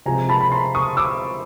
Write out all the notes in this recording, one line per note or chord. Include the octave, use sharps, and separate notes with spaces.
C3 F3 G#3 C4 G#5 A#5
A5 B5
B5
A#5 C6
C#6 D#6
D6 E6